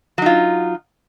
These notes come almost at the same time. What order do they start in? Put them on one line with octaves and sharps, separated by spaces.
F#3 D#4 F4